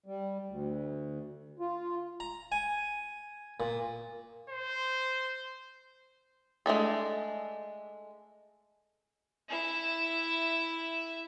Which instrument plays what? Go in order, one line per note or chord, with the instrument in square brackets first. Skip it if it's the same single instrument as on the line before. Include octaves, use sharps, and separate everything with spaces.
[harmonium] G3
D2
F4
[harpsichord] A#5
G#5
A#2
[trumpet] C5
[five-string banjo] G#3 A3 D4 A4
[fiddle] E4 E5